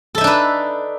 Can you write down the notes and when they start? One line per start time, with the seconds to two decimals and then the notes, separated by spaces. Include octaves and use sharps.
0.15 A4
0.18 E5
0.21 D#4
0.24 D4
0.27 B4